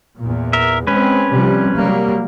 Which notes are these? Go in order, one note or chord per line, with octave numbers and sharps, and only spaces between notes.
E2 A#2
A#4 E5
G#3 C4 C#4 B4
C3 F3 G3
F#3 G3 A#3